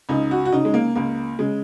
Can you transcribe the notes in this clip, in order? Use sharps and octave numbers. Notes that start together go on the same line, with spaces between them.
C#2 D#4
F#4
F#4
C#3 D#4
G#3
A#3
C#2 A#3
C#3 G#3